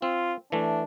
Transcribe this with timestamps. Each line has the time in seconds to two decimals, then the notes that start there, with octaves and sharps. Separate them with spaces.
0.02 C4 F4
0.52 E3 A3 D4